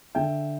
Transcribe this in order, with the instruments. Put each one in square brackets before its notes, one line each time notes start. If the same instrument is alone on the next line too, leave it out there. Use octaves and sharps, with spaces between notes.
[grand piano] D3 E5 G5